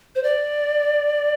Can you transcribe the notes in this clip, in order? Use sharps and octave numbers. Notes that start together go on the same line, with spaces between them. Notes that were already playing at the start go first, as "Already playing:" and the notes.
C5
D5